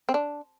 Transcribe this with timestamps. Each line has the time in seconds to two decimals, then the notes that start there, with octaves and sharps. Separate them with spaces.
0.09 C4
0.14 D4